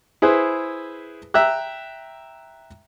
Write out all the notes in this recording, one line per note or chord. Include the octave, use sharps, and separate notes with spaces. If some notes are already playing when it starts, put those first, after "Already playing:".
E4 G#4 B4 C5
E5 G5 A#5 E6 F#6